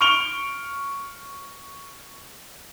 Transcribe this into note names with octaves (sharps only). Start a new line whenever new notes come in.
C#6 F6 D7 F7 G7